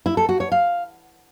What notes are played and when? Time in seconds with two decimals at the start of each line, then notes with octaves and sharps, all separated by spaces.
0.06 E4
0.17 A4
0.29 F#4
0.40 C#5
0.52 F5